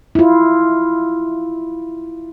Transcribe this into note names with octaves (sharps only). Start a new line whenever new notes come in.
E4 F4